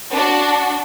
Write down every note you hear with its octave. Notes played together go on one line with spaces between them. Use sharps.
D4 F#4